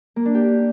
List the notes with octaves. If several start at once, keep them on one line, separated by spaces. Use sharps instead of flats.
A#3
D4
G4